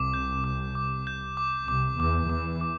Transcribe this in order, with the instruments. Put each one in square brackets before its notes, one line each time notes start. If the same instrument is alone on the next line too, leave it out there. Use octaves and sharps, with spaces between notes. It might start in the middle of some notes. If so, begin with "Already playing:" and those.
Already playing: [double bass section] C2 C3 [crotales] D6
[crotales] G6
D6
D6
G6
D6
[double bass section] C2 C3 [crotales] D6
[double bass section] E2 E3 [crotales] D6
[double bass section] E2 E3 [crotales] D6
[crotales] D6